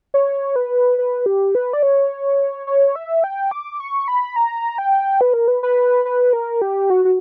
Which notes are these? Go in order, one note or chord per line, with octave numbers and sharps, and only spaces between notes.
C#5
B4
B4
G4
B4
D5
C#5
C#5
E5
G5
D6
C#6
B5
A#5
G5
B4
A#4
B4
B4
B4
A#4
G4
F#4
F#4